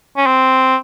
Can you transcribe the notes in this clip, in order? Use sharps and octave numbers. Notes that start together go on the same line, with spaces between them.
C#4
C4